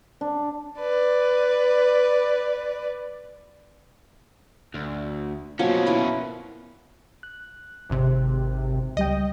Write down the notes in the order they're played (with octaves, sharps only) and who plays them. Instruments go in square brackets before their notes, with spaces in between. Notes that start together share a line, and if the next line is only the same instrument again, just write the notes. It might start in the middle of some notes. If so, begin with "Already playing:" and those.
[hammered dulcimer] D4
[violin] B4 D5
[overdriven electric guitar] D2
[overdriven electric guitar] B2 C#4 [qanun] F3 F#3 A#3
[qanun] E4 A#4 B4
[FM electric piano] F#6
[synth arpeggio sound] G#1 C3
[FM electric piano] C#2 G3 G5 [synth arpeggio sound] D#5